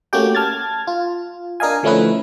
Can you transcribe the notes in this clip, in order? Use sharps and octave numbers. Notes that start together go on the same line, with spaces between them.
A3 A#3 C#4 F#4 G4 G5
A5 F6 G#6 A6
F4
D4 A#4 D#5 F5 G#5
D3 F3 A3 C#4 E4 B4